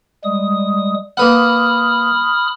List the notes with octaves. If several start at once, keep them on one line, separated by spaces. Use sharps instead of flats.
G3 G#3 D#6
A#3 B4 F#5 B5 D#6 F6